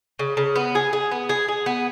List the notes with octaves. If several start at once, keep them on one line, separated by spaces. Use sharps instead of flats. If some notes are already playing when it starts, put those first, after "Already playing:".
C#3
C#3
B3
G#4
G#4
B3
G#4
G#4
B3